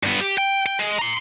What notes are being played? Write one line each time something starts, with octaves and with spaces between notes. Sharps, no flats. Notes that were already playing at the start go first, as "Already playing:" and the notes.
G2 B3
G4
G5
G5
G#3
A#5 C6